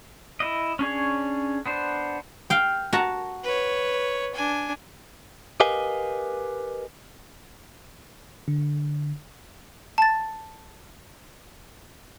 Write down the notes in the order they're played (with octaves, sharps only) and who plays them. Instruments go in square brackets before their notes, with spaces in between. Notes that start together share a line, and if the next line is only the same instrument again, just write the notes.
[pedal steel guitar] E4 D#5
C#4 D4 G#4 C#5
B3 D4 C5
[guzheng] F5 G5
F#4 A5 A#5
[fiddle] B4 C#5
D4 G#5
[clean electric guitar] G4 A#4 B4 D#5 F5 G#5
[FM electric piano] D3
[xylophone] A5 A6